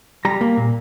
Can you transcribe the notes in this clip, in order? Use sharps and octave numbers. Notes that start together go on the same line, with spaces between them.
G3 A#5
A#3
A#2